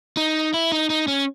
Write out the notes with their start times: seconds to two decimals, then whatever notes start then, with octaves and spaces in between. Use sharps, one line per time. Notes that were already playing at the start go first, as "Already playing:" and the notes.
0.17 D#4
0.54 E4
0.72 D#4
0.90 D#4
1.08 C#4